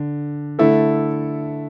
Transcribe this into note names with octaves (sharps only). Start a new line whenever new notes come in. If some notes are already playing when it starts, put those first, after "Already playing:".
Already playing: D3
D3 A3 E4 A4